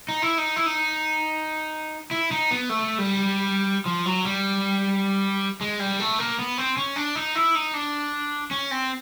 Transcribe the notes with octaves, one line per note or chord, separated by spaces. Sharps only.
D#4
E4
D#4
E4
D#4
E4
D#4
B3
A3
G3
F3
F#3
G3
G#3
G3
A3
A#3
B3
C4
C#4
D4
D#4
E4
D#4
D4
C#4
C4